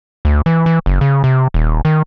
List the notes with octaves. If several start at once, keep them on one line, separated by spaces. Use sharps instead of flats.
D2
E3
E3
F#1
C#3
C3
D#1
D#3